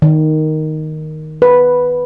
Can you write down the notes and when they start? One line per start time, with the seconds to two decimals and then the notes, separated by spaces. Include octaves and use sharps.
0.02 D#3
1.42 B4